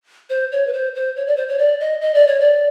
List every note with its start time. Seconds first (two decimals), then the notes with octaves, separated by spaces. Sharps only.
0.30 C5
0.52 C#5
0.67 B4
0.73 C5
0.95 C5
1.16 C#5
1.27 D5
1.37 C5
1.48 C#5
1.59 D5
1.80 D#5
2.01 D#5
2.14 D5
2.27 C#5
2.40 D5